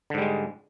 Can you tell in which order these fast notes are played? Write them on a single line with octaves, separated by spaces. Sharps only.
D3 G#2 G3 G#3